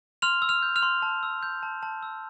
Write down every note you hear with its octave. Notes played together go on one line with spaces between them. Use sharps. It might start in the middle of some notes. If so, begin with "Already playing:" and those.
C6 F6 F7
E6
F6 F7
G6
F6 F7
C6
A5
E6
G6
A5
A5
E6